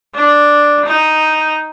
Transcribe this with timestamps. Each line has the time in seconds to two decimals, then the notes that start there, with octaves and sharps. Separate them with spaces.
0.15 D4
0.85 D#4